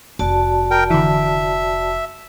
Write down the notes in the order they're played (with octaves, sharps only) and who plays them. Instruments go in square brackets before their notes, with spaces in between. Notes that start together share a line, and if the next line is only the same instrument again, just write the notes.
[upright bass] F1 [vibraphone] F#4 D5 A5
[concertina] A#4 G5
[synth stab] D3 E3 [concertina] E5